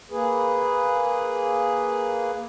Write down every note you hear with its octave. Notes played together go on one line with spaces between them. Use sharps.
A#3 G#4 B4